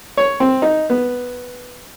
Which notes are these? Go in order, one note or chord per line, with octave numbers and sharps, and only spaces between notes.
C#5
C4
D#4
B3